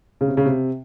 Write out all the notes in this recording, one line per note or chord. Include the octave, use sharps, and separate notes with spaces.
C#3
C3
C#3
C3